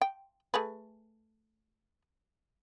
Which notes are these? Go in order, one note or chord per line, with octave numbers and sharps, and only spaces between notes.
G5
A3 G#4 B4